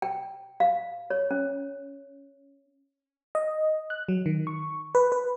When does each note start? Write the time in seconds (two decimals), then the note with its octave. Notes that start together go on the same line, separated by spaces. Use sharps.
0.02 G5
0.60 F5
1.10 C#5
1.31 C#4
3.35 D#5
3.90 F#6
4.08 F#3
4.26 D#3
4.47 C#6
4.95 B4
5.12 B4